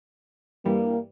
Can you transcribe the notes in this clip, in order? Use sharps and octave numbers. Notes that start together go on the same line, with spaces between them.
G2 E3 G3 A#3